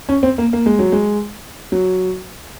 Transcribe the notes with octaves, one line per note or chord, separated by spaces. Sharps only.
C#4
C4
A#3
A#3
G#3
F#3
G#3
F#3